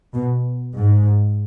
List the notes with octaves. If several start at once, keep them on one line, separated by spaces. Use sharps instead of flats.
B2
G#2